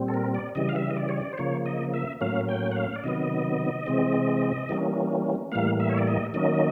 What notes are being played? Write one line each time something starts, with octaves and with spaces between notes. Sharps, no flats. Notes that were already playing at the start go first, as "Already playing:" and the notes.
Already playing: A#2 G3 C4
A4
A#4
D5
C#3 E3 G3 D#5
F5
E5
D#5
D5
C#5
D5
C5
C#3 F3 A#3 C#5
D#5
E5
A2 F#3 A#3 C#4 F5
G5
F#5
F5
D5
C3 D#3 F#3 B3 D#5
C3 E3 G#3 C4
E3 G3 A#3 C#4
A2 E3 G3 A#3 F5
E5
C#5
D5
D#5
D#3 F#3 A#3 C#4 D#5